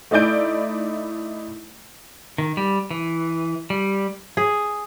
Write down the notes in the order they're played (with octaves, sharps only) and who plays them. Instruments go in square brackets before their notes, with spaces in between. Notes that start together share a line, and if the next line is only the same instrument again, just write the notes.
[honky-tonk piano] A3 D#4 E4 D5 G6 D7
[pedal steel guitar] D#3
G3
E3
G3
[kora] G#4